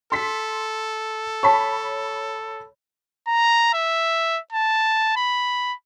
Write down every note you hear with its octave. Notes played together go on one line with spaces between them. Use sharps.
A4 C6 B6
C#5 A5 B5 C#6 B6
A#5
E5
A5
B5